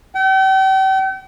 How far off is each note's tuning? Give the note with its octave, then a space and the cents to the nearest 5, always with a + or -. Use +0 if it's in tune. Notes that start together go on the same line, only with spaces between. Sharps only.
G5 -40